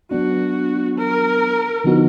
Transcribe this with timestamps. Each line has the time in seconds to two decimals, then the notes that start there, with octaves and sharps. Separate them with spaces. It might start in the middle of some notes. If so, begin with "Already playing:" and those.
0.11 F#3 B3 D4 F#4
0.98 A#4
1.84 D3 F3 B3 D#4 F#4